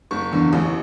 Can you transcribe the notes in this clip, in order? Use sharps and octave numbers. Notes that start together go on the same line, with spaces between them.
F#1 C#6
E2 D3
A1